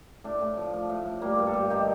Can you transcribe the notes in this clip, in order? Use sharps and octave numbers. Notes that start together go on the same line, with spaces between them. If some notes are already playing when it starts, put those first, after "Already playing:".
A2 D4
A2
F3
F3
A2
A2
G3 A#3
G2
A4
G2
D#3 G4